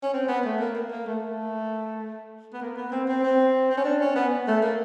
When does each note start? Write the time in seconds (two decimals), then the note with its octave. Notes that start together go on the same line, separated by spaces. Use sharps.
0.03 C#4
0.14 C4
0.28 B3
0.45 A3
0.60 A#3
0.75 A#3
0.91 A#3
1.06 A3
1.23 A3
2.53 B3
2.62 A#3
2.77 B3
2.92 C4
3.08 C4
3.23 C4
3.71 C4
3.77 C#4
3.84 D4
4.01 C#4
4.15 B3
4.48 A3
4.62 A#3